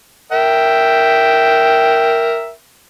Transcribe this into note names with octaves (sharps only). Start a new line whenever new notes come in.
A#4 E5 G5